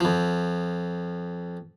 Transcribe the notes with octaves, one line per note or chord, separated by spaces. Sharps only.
F2 F3